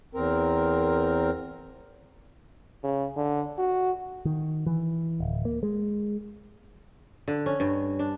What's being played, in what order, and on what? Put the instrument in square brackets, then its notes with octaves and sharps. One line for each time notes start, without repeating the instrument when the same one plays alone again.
[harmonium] E2 C4 A#4
[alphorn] C#3
D3
F#4
[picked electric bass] D#3
E3
D1
A#3
G#3
[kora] D3
C#4
G2
D4